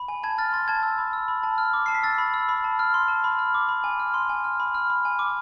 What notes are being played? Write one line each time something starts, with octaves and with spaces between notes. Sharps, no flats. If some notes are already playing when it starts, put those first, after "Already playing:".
Already playing: B5
G#5
A5 G#6
F6 A6
C6 A6
A5 G#6
E6
B5
E6
B5
A5
F6
D6
A5 C7
B6
E6 A6
B5
E6
B5
A5
F6
C6
A5
B5
F6
D6
B5
G#5
F6
C6
G#5
F6
B5
F6
B5
G#5
D6